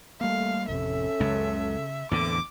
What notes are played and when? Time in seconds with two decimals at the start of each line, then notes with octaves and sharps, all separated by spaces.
0.21 G3 A3 A#3 F5
0.68 A1 F2 C3 C#4 A4 E5
1.20 C#2 F#2 C#3
2.11 E2 A2 D3 A#3 C4 A4 D6